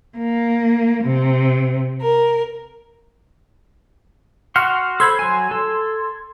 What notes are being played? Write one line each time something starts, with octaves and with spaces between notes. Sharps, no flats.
A#3
C3
A#4
F#4 F#5 C6 F6
A4 C5 B5 C6 G#6
F#3 G#5
A4